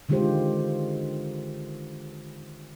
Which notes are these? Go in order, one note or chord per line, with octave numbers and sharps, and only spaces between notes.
D3 D#3 G#3 F4 G4 C5